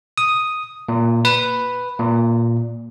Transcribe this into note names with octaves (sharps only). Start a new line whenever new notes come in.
D#6
A#2
B4
A#2